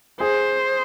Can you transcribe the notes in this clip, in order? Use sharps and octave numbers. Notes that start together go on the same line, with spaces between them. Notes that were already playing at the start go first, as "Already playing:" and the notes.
G#4 C5